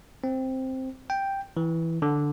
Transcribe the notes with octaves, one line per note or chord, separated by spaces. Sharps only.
C4
G5
E3
D3